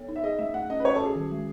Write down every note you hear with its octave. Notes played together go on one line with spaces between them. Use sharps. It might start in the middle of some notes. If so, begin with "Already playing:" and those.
Already playing: B3 A4 C#5
D#4
E5
G#4 D#5
A3 E5
A3 F#5
C#4 D#5
B4
C#4 C#5
A4
F#4 G#4
D#3
G#3